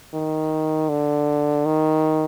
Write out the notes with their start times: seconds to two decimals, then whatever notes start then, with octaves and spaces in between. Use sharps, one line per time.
0.14 D#3
0.89 D3
1.65 D#3